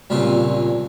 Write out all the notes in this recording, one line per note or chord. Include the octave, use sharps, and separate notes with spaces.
C#2 G2 A#2 C4